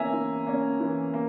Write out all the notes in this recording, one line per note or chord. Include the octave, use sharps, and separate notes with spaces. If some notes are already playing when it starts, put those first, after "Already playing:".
Already playing: E3 A#3 C#4 E5 G#5 A#5
E3
A#3 C#4
E3
A#3